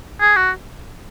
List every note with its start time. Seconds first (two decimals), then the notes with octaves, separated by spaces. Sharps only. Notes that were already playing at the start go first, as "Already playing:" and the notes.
0.20 G#4
0.37 F#4